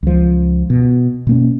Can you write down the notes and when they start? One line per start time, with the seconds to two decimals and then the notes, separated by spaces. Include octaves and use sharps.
0.03 C#2 F3
0.70 B2
1.27 B2 A#3 C#4